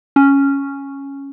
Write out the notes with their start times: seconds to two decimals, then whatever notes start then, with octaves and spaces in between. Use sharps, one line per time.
0.16 C#4